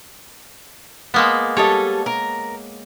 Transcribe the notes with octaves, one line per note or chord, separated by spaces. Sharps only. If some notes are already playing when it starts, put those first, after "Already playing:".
G#3 A#3 B3
G3 A4 C#5 D#5
A#4